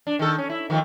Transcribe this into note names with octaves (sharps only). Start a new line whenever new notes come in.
D4
D#3 A4
C#4
E4
D#3 F3 A3